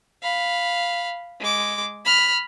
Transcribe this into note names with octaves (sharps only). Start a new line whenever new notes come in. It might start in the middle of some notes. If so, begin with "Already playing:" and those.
F5 B5
G#3 D6
B5 F6